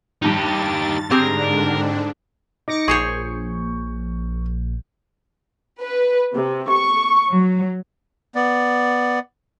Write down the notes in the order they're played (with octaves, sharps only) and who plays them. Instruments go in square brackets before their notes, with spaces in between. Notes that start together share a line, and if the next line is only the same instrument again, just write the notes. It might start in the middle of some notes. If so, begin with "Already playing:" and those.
[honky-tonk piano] G2 D#3 [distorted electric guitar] D#4 G4 [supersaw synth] A6
[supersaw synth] G#2 D3 D4 [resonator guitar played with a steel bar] C4 G4 G#4 [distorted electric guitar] A#4
[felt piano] D#4 [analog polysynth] D6 A#6 C#7
[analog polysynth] A#1 [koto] G#4 C5 C#5 [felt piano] C#6 G6
[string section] B4
C3
C#6
F#3
[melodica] B3 D5